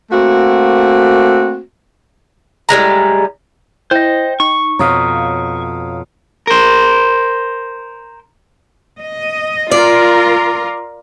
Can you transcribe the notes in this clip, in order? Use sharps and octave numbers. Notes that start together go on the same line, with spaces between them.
A3 A#3 C4 F#4
A2 G3 G#3 A#5
E4 C5 D#5 G5
D#4 C#6
F2 B2 C#5 F5 A#5 D#6 F6
A#4 C5
D#5
F4 A#4 D5